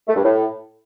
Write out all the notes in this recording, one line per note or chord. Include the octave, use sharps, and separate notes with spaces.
A3
G2
A2